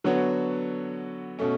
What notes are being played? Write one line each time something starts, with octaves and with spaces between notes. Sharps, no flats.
D3 F#3 B3 F#4 C#5
B2 A3 C#4